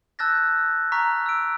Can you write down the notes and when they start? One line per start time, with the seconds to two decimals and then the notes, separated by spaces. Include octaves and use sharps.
0.19 A5 E6 F#6 G6 A6 A#6
0.92 A#5 C#6 F6 B6
1.26 E6 D7